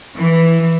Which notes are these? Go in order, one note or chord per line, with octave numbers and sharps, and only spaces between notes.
E3